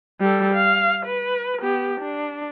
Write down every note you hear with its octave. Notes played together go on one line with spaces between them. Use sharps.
G3 A4
F5
B4
B3 G4
D4